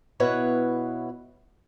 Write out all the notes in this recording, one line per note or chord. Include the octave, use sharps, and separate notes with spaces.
B2 E4 B4 C#5 F#5